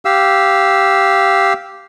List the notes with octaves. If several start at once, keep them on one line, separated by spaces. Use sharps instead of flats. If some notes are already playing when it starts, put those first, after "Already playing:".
G4 F5 E6